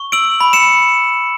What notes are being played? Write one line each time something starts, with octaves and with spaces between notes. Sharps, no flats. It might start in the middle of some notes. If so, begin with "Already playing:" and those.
Already playing: C#6
E6 D7 F#7
B5
C#7 E7